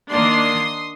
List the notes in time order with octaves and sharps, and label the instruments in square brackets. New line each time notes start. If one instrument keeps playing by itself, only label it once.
[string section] D#3 A#3 D4 C6 D#6